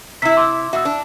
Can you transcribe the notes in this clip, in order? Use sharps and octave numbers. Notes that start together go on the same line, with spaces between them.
C3 E4 B6
C6 D6 E6
B2 F#4 E5 E6
D4